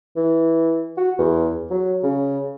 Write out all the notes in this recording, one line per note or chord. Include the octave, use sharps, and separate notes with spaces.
E3
F#4
E2
F#3
C#3